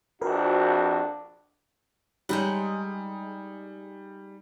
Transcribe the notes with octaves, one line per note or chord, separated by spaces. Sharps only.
A#1 F2 D4 F#4 A#4 B4
G3 G#3 D#4 F#5